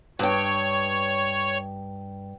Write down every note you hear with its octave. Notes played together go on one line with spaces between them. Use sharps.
G2 C#5 G5